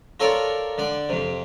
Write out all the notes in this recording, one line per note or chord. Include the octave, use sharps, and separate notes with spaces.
F4 A4 A#4 C#5 D5
D3 D5
F2 C3